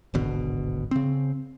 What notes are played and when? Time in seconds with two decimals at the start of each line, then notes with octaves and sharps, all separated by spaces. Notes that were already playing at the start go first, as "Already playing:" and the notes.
0.14 D1 G#1 B2 D3
0.91 C#3 C4